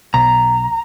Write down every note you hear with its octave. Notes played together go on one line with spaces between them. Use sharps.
B1 A#5